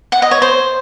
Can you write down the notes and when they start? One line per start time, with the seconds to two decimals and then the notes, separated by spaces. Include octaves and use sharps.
0.12 F#5
0.22 D#5
0.31 C#5
0.42 C5